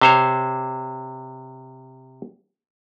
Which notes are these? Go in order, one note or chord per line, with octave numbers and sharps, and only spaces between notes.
C3 C5 C#5